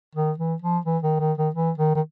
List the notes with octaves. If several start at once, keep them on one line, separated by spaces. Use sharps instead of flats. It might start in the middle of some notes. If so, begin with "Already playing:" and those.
D#3
E3
F3
E3
D#3
D#3
D#3
E3
D#3
D#3